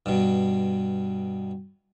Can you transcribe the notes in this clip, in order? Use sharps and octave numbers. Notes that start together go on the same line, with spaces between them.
G2 B2